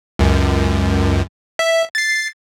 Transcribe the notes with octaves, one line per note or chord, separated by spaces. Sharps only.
C#2 F#2
E5
A6 C7